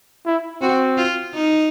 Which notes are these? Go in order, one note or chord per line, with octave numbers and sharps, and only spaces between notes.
E4
C4 F#4
F4
D#4